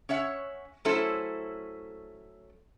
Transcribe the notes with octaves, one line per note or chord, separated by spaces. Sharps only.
C#4 C#5 E5 F#5
F#3 A3 C#4 E4 A4 C5